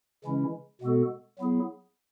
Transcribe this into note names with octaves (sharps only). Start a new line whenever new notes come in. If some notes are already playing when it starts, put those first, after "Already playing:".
C#3 E3 G#3 C#4 E4
B2 G#3 B3 F#4 A4
F#3 B3 E4 G#4